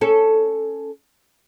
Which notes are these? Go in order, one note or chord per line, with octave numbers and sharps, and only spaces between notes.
C#4 A4